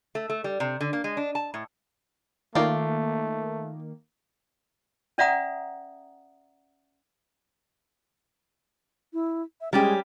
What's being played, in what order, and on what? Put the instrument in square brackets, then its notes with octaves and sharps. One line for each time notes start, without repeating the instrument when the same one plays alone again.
[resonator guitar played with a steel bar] A3
A3
G3
C3
D3
A#3
G#3
D4
A5
A2
[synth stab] D#3 A#3 [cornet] A3 [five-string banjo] F4 D5
[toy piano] C#4 D5 E5 F#5 A#5 D#6
[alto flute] E4
E5
[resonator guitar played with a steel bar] G3 C#4 G4 [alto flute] G#3